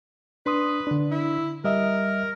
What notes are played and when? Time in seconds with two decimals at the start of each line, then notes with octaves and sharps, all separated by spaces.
0.46 D4 B4 C6 D#6
0.87 D3 D4
1.11 E4
1.64 G3 A#4 D#5 E5